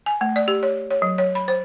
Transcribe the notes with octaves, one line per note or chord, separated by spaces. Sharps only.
G#5
A3
D5
G4
C#5
C#5
F#3
C#5
B5
C5